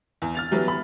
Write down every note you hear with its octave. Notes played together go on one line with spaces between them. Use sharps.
E2
F6 A6 F7
E3 F#3 G3 B3
B5